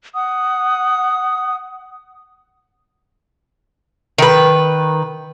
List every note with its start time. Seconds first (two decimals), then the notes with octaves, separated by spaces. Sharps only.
0.14 F#5 D#6
4.18 D#3 B4